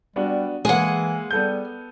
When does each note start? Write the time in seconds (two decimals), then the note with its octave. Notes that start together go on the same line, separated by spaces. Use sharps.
0.16 G3 B3 D4 F#4
0.65 E3 G#3 A#3 G#4 F#5
1.31 G3 B3 A4 G6